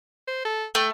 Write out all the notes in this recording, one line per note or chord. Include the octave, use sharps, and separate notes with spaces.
C5
A4
A3 G5